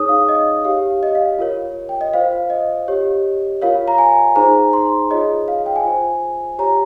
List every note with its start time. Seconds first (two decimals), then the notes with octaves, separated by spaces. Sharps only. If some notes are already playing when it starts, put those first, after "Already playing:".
Already playing: D#4 G#4 C#5 D#6
0.09 F5
0.29 D#5
0.64 G4 C#5 F5
1.03 D#5
1.15 F5
1.39 F4 A#4 C#5
1.89 G5
2.01 D#5
2.14 F4 C5 F5
2.50 D#5
2.88 G4 C#5
3.62 F4 A#4 C#5 F5
3.88 A#5
3.98 G#5
4.36 D#4 G#4 C5 A#5
4.73 C6
5.10 F4 G#4 C#5 D#5
5.48 F5
5.66 G5
5.76 G#5
5.84 F4 C5
6.59 G4 C#5 A#5